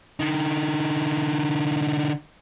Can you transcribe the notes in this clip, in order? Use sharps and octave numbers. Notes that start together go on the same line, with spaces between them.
D3 D#4